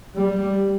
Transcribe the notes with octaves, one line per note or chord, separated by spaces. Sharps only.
G3